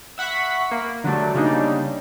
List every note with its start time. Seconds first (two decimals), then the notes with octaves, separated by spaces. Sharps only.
0.18 E5 F#5 B5 C#6 B6
0.71 A#3
1.04 D3 F#3 G3 A3 D4
1.35 C#3 G3 A#3 D4 D#4